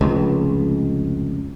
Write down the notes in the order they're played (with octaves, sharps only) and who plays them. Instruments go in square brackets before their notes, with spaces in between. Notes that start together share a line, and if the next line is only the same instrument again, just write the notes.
[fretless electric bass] F1 C#2